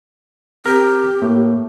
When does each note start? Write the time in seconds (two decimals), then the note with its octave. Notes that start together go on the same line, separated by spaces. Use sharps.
0.66 C4 G4 A#4
1.22 A2 A#3